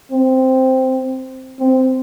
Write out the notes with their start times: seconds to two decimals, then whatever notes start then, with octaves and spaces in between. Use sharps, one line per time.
0.11 C4
1.59 C4